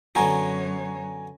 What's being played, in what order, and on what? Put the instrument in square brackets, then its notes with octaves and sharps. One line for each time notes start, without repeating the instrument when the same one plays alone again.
[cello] F#2 C#5 [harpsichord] D3 B3 F#4 [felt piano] G#5 A#5